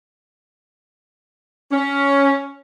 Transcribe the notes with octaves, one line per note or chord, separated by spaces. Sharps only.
C#4